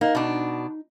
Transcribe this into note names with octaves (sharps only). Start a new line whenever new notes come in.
A#3 D#4
B2 D4